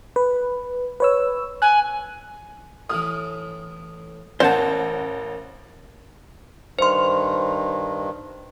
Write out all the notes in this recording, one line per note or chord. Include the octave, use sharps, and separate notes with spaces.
B4
B4 C#5 E6
G#5 F#6
A2 E3 D#6 F6
A1 A#3 C5 F5 F#5 A5
G2 D#3 C5 C6